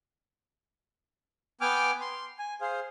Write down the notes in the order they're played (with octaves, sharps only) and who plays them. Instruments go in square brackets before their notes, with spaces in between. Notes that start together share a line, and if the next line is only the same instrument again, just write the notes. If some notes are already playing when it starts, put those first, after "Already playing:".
[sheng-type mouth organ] B3 G5 G#5 D6 F6
C6
G#5
G#4 C5 F5